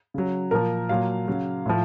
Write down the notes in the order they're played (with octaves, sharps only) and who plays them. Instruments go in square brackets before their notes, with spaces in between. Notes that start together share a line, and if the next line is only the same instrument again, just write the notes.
[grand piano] C#3 F#3
A#2 F3 A#4
A#2 F#3 F5
C#3 F#3
A2 F3